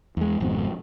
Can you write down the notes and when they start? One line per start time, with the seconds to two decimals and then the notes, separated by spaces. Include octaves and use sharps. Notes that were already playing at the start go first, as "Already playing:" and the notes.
0.17 E2 G#3
0.40 G#1 F2 G#2 B2